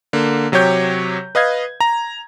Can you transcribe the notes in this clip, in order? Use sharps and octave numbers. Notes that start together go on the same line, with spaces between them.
D3 A#3
C3 F#3 G4 C#5 G6
B4 D#5 F5 G#6
A#5